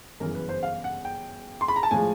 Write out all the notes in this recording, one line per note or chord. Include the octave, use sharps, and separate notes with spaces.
G1 F#2 C#3 E3 A#4
B4
C5
F5
F#5
G5
C6
B5
A#5
A5
A2 F3 G#3 G#5